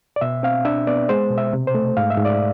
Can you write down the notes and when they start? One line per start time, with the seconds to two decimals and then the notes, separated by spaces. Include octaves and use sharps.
0.16 D5
0.21 B2 E5
0.43 C4 F5
0.65 D4 E5
0.87 B3 D5
1.09 G#3 C5
1.30 B2
1.38 E5
1.53 C3
1.67 C5
1.75 A3
1.97 G#2 F5
2.10 E5
2.18 G#2
2.25 D5